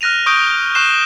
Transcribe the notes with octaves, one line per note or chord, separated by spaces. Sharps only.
F6 F#6 A#6 D#7 F7
C#6 D#6 G6 D7 G7
C#6 F#6 C7 E7 G7